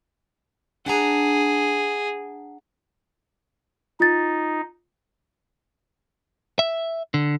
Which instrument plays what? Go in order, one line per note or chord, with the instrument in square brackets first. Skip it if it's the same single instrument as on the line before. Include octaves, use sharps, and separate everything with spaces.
[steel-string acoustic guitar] D4 F#5 A#5 [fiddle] G#4
[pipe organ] D#4 [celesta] F4 A6
[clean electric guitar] E5
D3